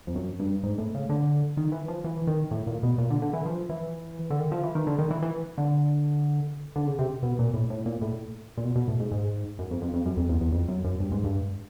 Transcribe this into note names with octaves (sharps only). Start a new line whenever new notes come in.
F2
F#2
G2
G#2
A2
C#3
D3
D#3
E3
F3
E3
D#3
A2
A#2
B2
A#2
D3
D3
E3
F3
E3
D3
D#3
F3
E3
D#3
D3
D#3
E3
E3
D3
D3
C#3
C3
B2
A#2
A2
A2
A#2
A2
A#2
B2
B2
A2
G#2
G#2
F#2
F2
F2
F2
F#2
F2
E2
E2
F2
F#2
F#2
G2
G#2
G2